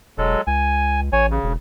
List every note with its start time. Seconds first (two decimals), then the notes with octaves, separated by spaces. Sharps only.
0.18 E1 F#3 G#3 A4
0.47 C#2 G#5
1.12 A1 C#5 G#5
1.31 C#3
1.44 E1